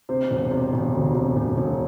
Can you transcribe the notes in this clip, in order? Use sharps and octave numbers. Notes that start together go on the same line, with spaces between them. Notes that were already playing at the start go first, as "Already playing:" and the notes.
C3 C5
E1
C3
E1
D2
C3
E1
E1